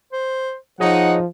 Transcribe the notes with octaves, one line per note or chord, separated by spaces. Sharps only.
C5
F3 D#4 G#4 C#5 D#5 F#5